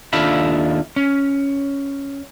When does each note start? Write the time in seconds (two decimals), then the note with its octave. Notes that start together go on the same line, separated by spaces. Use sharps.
0.13 D#2 D4 F4 A4 E5 B5
0.96 C#4